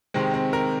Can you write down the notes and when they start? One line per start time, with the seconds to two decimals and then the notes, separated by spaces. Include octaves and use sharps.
0.14 C3 D#3 G#3 C4
0.34 C4
0.53 A#4